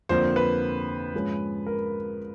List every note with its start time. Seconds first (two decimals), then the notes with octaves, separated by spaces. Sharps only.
0.09 F2 D3 F3 A#3 C5
0.36 B4
1.14 G#2 F3 G#3 C#4
1.66 A#4